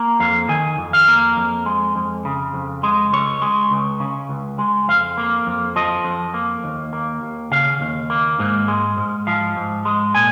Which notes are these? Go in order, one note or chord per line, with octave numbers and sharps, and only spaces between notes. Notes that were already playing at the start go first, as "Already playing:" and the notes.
Already playing: A#3
F2 F5
D#3 G#5
F2
F5
A#3
F2
G#3
F2
C#3
F2
G#3
C#2 C#5
G#3
C#2
C#3
C#2
G#3
F2 F5
A#3
F2
F3 D#5
F2
A#3
D#2
A#3
D#2
C#3 F5
D#2
A#3
G#2
G#3
G#2
F3 F5
G#2
G#3
A#2 G#5